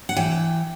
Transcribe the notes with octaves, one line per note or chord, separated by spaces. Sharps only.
F#5
E3 G5